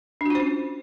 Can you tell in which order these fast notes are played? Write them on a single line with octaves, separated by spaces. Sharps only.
D4 F#4 F4 C5 C#4